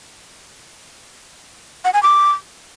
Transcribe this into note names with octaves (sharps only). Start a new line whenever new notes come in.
F#5
G#5
D6